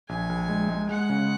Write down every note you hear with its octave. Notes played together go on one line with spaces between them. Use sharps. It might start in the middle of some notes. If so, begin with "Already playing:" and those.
A#1 G#5
A#1
G#3
G#3
G#3 F#5
C#3